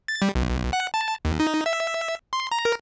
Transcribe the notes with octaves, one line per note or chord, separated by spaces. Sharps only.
A6
G3
B1
F#5
A5
D#2
D#4
E5
C6
A#5
A#4